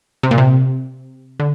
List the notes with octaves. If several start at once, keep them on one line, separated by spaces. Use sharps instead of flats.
C3
A#2
C3
D3